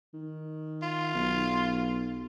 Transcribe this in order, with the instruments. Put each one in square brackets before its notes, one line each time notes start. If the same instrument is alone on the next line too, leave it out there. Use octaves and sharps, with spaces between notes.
[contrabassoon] D#3
[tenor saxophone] F4
[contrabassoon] B1